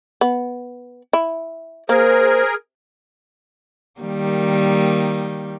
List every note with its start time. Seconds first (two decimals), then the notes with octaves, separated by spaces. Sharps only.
0.21 B3
1.13 E4
1.89 A#3 G#4 A#4 C5
4.01 D#3 G3 A#3